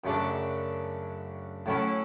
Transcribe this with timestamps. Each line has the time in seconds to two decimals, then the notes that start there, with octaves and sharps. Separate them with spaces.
0.04 F#2 C#3 F#3 A3 D4
1.66 A2 F#3 A3 C#4 E4